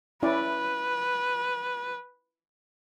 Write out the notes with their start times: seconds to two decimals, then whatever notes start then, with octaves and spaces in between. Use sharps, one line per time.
0.23 C#4 E4 B4 D5